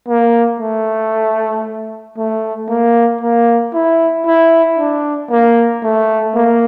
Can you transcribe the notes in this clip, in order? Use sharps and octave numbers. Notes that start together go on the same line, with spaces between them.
A#3
A3
A3
A#3
A#3
E4
E4
D4
A#3
A3
A#3